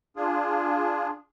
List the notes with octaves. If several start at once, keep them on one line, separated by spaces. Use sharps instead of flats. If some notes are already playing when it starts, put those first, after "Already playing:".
D4 F4 G#4